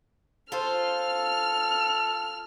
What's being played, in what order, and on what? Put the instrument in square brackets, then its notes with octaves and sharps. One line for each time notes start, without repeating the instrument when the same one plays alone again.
[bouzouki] F4 C5 [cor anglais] A4 [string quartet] F6